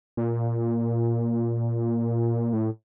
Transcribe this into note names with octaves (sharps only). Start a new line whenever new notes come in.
A#2
A2